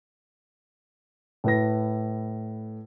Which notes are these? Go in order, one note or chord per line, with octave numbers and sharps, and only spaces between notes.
A2 B4 A#6